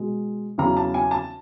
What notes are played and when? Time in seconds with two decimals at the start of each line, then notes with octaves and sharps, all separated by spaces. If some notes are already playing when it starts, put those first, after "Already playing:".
Already playing: B2 G#3
0.58 E2 C#3 F#3 A#5
0.77 A5
0.94 G#5
1.11 A5